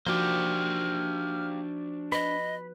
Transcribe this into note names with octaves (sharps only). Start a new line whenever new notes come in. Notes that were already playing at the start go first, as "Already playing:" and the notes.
F3 A#3 D4 D#4 F#4 G4 C5 F6
B4 D#5 B5